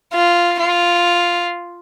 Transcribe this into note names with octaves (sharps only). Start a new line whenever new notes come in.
F4
F4